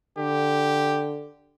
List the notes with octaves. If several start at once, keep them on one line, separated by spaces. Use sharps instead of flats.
D3 G4